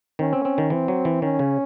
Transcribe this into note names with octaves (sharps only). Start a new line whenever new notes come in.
D#3 C#4
C4
C4
D#3
E3 C4
F#3
E3
D#3 C#4
C#3